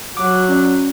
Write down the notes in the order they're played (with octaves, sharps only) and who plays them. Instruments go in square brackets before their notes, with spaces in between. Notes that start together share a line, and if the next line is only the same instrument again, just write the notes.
[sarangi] F#3 [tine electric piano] D6
[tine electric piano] C#4 D5